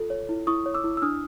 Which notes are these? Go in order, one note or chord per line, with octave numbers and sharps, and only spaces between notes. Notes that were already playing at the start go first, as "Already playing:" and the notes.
Already playing: F4 A4
C#5
E4
E4 C#6 D#6
C#5
D6 E6
E4
E6
D4 D#6 F6